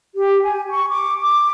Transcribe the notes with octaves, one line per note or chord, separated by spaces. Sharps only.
G4
G#5
C#6
D6
D6